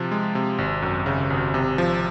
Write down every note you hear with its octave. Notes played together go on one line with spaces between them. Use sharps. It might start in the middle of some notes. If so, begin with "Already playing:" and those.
Already playing: C3 F3
G#3
C3
G#1
F#2
C#3
G#1
C3
F3